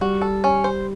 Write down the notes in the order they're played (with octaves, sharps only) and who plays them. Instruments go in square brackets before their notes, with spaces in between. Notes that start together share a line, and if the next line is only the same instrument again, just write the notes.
[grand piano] G3 [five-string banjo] F#4
[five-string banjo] A4
C#4
C5